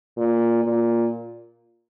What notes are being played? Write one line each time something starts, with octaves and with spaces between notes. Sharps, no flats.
A#2
A#2